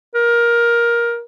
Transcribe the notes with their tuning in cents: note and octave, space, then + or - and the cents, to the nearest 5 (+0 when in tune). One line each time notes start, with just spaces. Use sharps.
A#4 +15